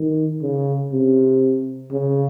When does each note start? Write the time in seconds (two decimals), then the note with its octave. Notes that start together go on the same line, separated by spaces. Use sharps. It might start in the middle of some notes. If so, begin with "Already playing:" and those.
Already playing: D#3
0.42 C#3
0.93 C3
1.92 C#3